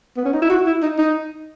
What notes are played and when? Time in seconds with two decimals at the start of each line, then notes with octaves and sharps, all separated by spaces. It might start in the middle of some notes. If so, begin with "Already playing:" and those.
0.17 B3
0.25 C#4
0.33 D#4
0.42 E4
0.50 F#4
0.67 E4
0.83 D#4
0.99 D#4